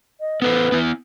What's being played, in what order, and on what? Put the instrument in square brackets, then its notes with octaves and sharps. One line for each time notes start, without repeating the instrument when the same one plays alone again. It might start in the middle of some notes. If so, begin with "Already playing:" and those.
[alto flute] D#5
[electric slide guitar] B3 A4 C5 [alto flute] B4
[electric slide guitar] B3 E4